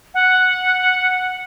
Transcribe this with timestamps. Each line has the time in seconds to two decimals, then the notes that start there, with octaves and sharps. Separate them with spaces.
0.14 F#5